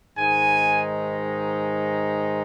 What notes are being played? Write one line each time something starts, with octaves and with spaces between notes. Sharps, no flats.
G#2 D#3 G#3 D#4 G#5